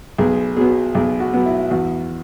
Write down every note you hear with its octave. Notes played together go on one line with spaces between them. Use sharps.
B1 G#4
B2 F#3 B3 G#4
B1 G#4
F#4
B2 F#3 B3
E4
E2 F#4